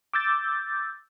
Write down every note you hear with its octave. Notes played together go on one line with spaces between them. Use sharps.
D6 E6 G6 A6